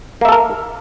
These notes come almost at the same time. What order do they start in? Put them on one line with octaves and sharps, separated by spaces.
A#3 E5 A4 A#4